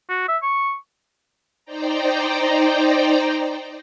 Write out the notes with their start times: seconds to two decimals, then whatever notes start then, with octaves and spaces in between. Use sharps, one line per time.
0.09 F#4
0.28 E5
0.43 C#6
1.65 D#4 C5 D5 G5 A#5